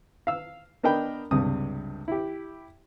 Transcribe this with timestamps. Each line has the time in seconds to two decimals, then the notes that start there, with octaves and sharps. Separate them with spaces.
0.27 F5 E6
0.83 B3 D4 A#4 D#5 G5 B5
1.31 C#2 G2 C3 D#6
2.08 E4 G4